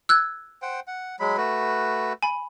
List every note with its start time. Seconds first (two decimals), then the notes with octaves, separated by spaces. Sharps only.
0.09 E6 F#6 G#6
0.62 C5 F#5 G5
0.87 F#5
1.20 F#3 G#3 B5
1.37 A3 F#4 B4
2.23 G#5 B5